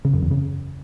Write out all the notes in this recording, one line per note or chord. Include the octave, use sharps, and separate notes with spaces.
C#3
F#2
E2
C#3